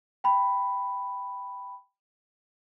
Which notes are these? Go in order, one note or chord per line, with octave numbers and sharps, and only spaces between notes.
G5 B5